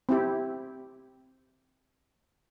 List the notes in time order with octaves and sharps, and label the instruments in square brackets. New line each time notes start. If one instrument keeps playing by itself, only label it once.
[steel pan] C4 E4 G4